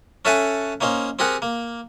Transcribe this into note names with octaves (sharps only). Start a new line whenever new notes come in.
C#4 A4 E5 F#5 G#5 A5
A#3 C#4 D#4 C5
C4 G4 G#4 A#4 F#5
A#3